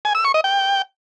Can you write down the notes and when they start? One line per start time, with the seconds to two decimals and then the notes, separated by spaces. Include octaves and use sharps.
0.05 G#5
0.15 E6
0.25 C#6
0.34 D#5
0.44 G5